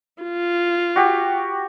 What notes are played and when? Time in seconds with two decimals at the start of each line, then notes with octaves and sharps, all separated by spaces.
0.22 F4
0.96 F#4 G4